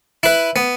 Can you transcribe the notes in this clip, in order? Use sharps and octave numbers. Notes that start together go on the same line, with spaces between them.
E4 B4
B3